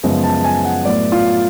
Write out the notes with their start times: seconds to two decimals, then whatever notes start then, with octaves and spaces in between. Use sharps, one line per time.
0.03 F#2 C#3 F3 G#3 B3
0.23 A5
0.44 G#5
0.65 F#5
0.85 A2 F#3 B3 D5
1.12 F4